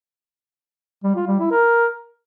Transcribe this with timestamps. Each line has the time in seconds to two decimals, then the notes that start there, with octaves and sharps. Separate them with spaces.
1.04 G3
1.15 F4
1.27 G3
1.39 E4
1.51 A#4